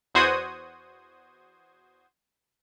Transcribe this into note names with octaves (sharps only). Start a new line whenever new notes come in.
E2 F#4 C5 D#6 G#6